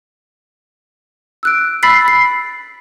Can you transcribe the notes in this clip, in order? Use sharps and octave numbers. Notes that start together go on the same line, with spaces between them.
E6 F#6 D7
B5 E6 A6 B6 C7
C7